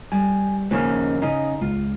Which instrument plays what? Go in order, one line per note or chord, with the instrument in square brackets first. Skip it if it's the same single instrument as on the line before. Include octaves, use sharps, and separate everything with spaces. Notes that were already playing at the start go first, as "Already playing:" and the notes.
[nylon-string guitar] G3 [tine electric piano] G#5
[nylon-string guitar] D#2 C#3 D#4 [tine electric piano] F3 C#4 A#4
[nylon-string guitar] C#3 D#5 [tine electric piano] D#4
[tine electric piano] C#2 [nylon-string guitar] F4